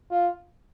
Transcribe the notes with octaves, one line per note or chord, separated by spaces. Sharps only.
F4